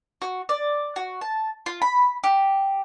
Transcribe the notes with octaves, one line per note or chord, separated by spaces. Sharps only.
F#4
D5
F#4
A5
F4
B5
G4